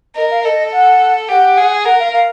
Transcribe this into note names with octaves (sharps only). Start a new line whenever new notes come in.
A#4 D#5
F5
A4 D#5
F#5
G4 F#5
G#4
A#4 F#5
F5
F5